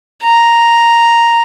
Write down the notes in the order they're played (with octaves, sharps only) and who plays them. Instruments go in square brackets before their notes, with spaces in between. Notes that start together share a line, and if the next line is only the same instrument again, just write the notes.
[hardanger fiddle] A#5